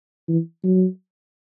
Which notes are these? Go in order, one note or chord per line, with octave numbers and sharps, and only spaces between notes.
E3
F#3